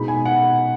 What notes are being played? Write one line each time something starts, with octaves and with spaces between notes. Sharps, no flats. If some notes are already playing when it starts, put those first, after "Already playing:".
Already playing: B2 G#3 D#4 B5
G#5
F#5